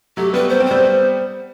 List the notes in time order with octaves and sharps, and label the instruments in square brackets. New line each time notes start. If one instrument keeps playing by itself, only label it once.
[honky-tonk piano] F#3 A3 [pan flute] G4
[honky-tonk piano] G3 B3 [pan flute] B4
[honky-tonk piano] B3 [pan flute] C5
[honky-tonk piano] C4
[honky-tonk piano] G3 B3 [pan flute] C5